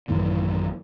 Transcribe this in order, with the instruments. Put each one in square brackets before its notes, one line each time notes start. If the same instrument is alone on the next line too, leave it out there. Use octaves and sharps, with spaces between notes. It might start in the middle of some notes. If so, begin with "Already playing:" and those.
[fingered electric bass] A1 F#2 A2 D#3